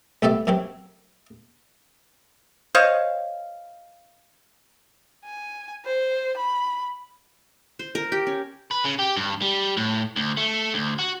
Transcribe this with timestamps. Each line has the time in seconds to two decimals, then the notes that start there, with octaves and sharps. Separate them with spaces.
0.22 C2 A3 B3 G4 D5 E5
0.47 F#2 F#3 C4 G4
2.75 C5 C#5 D#5 F5
5.25 G#5
5.85 C5
6.37 B5
7.79 C5
7.95 A#4
8.12 G4
8.27 C#4
8.71 B4
8.84 C#3
8.99 G4
9.17 G2
9.42 G3
9.77 A2
10.16 D2
10.37 A3
10.74 D2
10.99 F#4